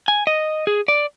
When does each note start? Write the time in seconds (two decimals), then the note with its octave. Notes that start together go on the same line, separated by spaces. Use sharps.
0.08 G#5
0.27 D#5
0.67 G#4
0.88 D5